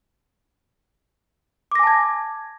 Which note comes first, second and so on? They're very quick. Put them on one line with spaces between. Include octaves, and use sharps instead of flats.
D6 A#6 G#5 A5 G#6